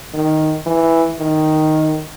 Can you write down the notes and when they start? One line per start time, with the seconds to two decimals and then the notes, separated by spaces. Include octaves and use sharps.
0.14 D#3
0.66 E3
1.19 D#3